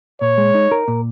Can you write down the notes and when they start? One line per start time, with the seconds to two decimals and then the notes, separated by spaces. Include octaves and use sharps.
0.21 A#2 C#5
0.38 G#3
0.55 D#4
0.71 A#4
0.88 A#2